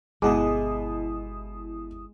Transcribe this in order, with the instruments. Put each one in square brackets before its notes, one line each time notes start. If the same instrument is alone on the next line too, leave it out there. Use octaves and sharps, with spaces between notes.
[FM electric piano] G1 E4 D#6 [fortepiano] B2 F#5 D6 [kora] G#3